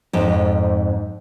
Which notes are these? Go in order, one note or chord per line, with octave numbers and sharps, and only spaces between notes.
F2 G#2